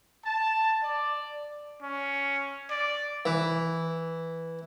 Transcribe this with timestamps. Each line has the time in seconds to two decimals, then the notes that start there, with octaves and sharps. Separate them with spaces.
0.24 A5
0.83 D5
1.82 C#4
2.71 D5
3.25 E3